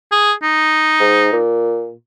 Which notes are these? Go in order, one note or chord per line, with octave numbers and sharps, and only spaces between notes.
G#4
D#4
G#2
A#2